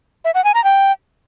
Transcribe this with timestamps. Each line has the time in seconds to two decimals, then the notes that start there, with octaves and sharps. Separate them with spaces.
0.25 E5
0.35 F#5
0.44 G#5
0.54 A#5
0.64 G5